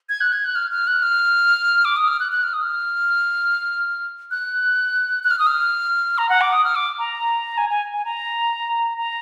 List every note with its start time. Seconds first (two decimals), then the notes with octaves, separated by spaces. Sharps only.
0.09 G#6
0.21 F#6
0.33 G#6
0.45 F#6
0.56 F6
0.71 F6
0.87 F#6
1.03 F6
1.85 D6
1.97 D#6
2.08 F6
2.20 F#6
2.32 F#6
2.44 F6
2.53 D#6
2.62 F6
4.31 F#6
5.23 F#6
5.31 F6
5.39 D#6
5.47 F6
6.18 A#5
6.29 F#5
6.41 D6
6.53 D#6
6.64 F6
6.75 D6
6.99 A#5
7.58 G#5
7.70 G#5
7.93 G#5
8.05 A#5
8.98 A#5